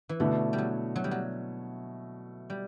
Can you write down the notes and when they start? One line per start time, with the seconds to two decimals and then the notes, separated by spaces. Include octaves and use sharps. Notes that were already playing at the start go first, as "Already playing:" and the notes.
0.09 E3
0.20 B2 D3 A3 E4
0.53 G3
0.58 F#3
0.96 F#3
1.04 G3
1.11 F#3
2.50 G3